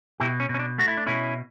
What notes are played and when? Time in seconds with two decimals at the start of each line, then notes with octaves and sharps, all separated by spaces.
0.20 B2 E4 G4
0.40 C#4
0.49 B2
0.54 C#4
0.59 D4
0.78 A3 F#4
0.88 E4
0.97 D4
1.06 B2 C#4 E4